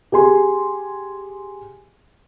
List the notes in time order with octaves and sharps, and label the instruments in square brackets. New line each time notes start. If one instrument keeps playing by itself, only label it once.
[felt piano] G4 G#4 G#5 C6